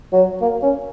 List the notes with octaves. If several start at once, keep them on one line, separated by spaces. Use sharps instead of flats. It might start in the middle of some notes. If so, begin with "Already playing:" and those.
F#3
A#3
C#4